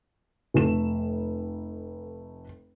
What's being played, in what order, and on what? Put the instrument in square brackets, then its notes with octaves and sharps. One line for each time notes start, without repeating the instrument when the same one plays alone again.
[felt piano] F1 A3 E7